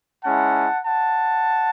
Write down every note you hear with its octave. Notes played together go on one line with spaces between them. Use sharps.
G#3 C#4 E4 F#5 A5
F#5 A5